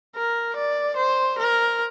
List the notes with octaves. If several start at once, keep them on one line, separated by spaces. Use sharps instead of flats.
A#4
D5
C5
A#4